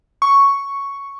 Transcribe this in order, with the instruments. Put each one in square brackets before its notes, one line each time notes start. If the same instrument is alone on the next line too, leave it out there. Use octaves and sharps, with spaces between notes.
[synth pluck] C#6